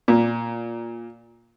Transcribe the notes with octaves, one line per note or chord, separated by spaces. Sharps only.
A#2